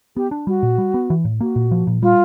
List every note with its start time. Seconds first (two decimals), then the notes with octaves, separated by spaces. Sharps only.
0.17 B3 G4
0.31 D4
0.47 G3 F#4
0.63 A#2
0.78 G3
0.94 B3
1.10 E3
1.25 A2
1.41 A#3 F#4
1.56 A#2
1.71 F3
1.87 A#2
2.02 G3 F4